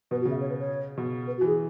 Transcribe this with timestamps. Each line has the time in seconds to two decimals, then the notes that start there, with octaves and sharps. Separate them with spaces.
0.11 B2 B4
0.20 F#4
0.25 C#3
0.30 E5
0.40 C#5
0.50 B4
0.59 C#5
0.97 B2
1.27 B4
1.37 F#4
1.41 E3
1.46 G#4